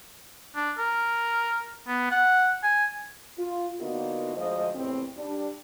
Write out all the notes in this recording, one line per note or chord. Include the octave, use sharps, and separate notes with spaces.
D4
A#4
B3
F#5
G#5
F4
D3 A#3 B3 D#4 F4 F#4
D2 F3 G#3 C5 D#5
E2 A2 C3 C4
G3 D4